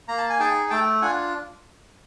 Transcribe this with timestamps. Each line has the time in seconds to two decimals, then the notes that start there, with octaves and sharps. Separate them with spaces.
0.08 A#3 A#5
0.18 A5
0.30 G#5
0.39 D#4 G#4 G5 A5
0.70 A3 G5 A5
1.02 D4 F4 F#5 G#5